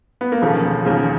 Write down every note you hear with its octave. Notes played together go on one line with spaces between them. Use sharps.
B3
A#3
E1 D#2 C#3 F3 A3
E1 D#2 C#3 F3